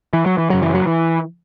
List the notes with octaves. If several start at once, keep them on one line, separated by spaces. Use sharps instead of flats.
E3
F#3
E3
F#2 C#3 F#3
E3
F#3
E3